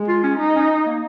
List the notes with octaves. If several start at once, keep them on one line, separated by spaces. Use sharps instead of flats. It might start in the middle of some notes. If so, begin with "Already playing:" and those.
Already playing: G#3
F4
C#4
D#4
C#4
A#3